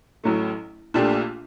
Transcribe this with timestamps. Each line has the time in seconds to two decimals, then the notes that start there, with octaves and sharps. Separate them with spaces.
0.24 A1 A2 F#3 A3
0.94 A#1 A#2 A3 D4 G4